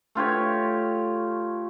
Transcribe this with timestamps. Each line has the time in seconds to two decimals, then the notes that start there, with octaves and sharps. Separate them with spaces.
0.15 A3 F4 G4 C#5